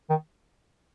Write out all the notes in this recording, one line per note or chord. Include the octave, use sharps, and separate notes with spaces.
D#3